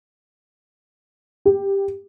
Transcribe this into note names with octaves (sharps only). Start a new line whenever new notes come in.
G4